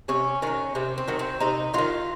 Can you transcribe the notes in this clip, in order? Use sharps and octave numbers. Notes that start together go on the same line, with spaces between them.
C3 C#4
D#3 F#3 C#4
C3 C4
C4
D#3 F#3
C4
C3 D#4
D#3 F#3 F4